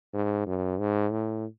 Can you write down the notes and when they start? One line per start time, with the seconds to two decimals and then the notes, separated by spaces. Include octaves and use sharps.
0.14 G#2
0.46 F#2
0.79 G#2
1.11 A2